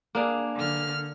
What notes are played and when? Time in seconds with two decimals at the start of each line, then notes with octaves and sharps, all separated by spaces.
0.15 A#3 D4 G#4
0.55 D3 F6